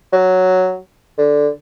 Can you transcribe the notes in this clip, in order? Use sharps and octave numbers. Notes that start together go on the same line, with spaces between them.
F#3
D3